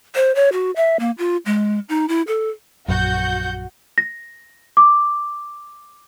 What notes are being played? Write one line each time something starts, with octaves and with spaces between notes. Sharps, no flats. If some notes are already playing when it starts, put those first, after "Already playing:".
C5
C#5
F#4
E5
A#3
F4
G#3
D#4
E4
A4
A#1 F#2 F#4 F#5 G6
A#6
D6